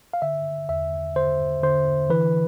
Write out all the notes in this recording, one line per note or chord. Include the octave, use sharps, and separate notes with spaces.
F5
D3 E5
E2 E5
D3 C5
D3 C5
E3 B4